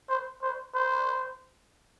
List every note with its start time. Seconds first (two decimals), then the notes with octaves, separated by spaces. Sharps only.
0.09 C5
0.42 C5
0.74 C5